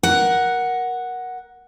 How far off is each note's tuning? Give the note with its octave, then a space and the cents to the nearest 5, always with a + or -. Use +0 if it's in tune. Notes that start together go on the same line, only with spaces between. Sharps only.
A#4 +20 F#5 +0